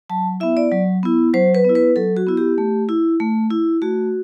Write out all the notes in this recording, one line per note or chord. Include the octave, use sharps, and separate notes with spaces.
F#3 A5
B3 E4 E5
D5
F#3
B3 E4
F#3 C5
B4
B3 E4
B4
F#3 A4
F#4
B3 E4
G4
A3
E4
A3
E4
A3 F#4